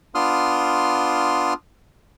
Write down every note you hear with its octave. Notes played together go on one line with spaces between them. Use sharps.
B3 D4 F4 C6 D#6 F6